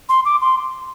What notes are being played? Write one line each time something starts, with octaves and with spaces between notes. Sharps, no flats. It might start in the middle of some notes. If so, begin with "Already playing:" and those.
C6
D6
C6